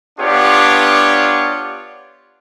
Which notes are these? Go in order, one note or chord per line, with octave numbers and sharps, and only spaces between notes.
B3 D4 F4 G4 C#5 D5